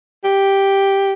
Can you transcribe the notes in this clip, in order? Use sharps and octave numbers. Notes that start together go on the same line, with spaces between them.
G4